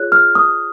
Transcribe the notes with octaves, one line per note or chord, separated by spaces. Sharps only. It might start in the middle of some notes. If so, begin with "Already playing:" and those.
Already playing: F4 G#4 C#5 F#6
F6
D#6